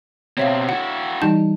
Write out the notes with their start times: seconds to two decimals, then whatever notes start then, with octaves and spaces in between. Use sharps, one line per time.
0.37 B2 C4 C#5 E5 F5
0.69 E4 F#4 F#5
1.22 E3 G3 D#4 A5 G6